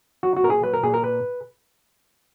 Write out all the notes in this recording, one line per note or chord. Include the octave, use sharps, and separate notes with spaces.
F#3 F#4
F#4
A#2 A#4
G#4
F#3 B4
A#4
A#2 G#4
A#4
B4